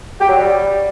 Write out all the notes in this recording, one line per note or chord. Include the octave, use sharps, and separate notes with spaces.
G4
F#3
G3